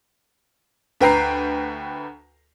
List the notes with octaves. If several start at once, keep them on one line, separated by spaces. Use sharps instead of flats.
D2 B4 G5 A#5 C7